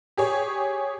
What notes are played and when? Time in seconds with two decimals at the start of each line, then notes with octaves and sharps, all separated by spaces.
0.17 G4 G#4 C#5